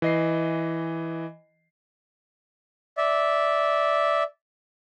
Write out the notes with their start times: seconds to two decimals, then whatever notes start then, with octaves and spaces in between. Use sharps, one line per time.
0.02 E3 D#5 C7
2.97 D5 E5